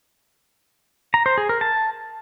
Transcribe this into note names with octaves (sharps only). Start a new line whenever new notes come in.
A#5
C5
G#4
A#4
A5